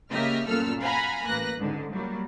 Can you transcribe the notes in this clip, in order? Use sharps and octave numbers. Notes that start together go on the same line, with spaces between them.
C#3 A#3 G4 D#5 E5 F6
G1 F#2 A#2 A4 E6 F6
F5 F#5 G#5 A#5 B5
A1 A#3 B4 F#6 A#6
C#2 G#2 D3
F#3 G3 A#3